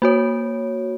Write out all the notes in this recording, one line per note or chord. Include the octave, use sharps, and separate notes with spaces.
A#3 F#4 C#5